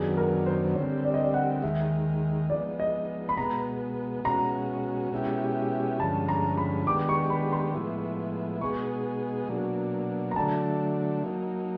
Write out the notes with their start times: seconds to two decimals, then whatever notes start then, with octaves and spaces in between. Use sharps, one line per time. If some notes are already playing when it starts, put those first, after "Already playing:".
Already playing: F#2 D#3 F#3 B3 D4 G#4
0.17 A#4
0.46 C5
0.75 D3 G3 C4 C#5
1.05 D5
1.14 D#5
1.23 D5
1.34 F#5
1.62 D#2 D#3 G#3 E5
2.50 F3 G#3 B3 D#4 D5
2.80 D#5
3.29 B5
3.37 B2 G#3 B3 A#5
4.24 B2 G#3 C#4 F#4 A#5
5.12 B2 G#3 C#4 E4 G4
5.99 G2 D3 F3 G#3 C#4 A5
6.29 A#5
6.57 B5
6.87 D#3 G#3 B3 D4 G4 D6
7.09 C#6
7.30 B5
7.52 C6
7.74 A2 F3 G#3 B3 E4
8.61 B2 G#3 B3 D#4 G#4 C#6
9.48 B2 F#3 A#3 D4
10.31 A#5
10.36 D3 F#3 A3 D4 A5
11.23 F#3 A#3 D#4